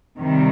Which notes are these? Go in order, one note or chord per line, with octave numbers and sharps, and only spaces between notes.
C3 D#3 G3